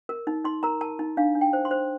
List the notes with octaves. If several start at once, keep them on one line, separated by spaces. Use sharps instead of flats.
A#4
D#4
D#4 C6
A#4 A#5
A#4 A5
D#4
D4 F5
D4
G5
C5
C6
C5